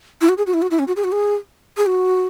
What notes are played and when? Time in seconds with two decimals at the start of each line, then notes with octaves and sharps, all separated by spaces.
0.21 E4
0.29 F#4
0.38 G#4
0.47 F#4
0.54 E4
0.62 F#4
0.71 E4
0.79 C#4
0.88 F#4
0.96 G#4
1.04 F#4
1.12 G#4
1.77 G#4
1.86 F#4